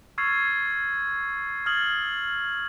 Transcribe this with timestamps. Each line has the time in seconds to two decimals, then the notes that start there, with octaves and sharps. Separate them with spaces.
0.18 C#6 E6 F6 G#6 A6 C7
1.66 D#6 F6 G#6 A6 F#7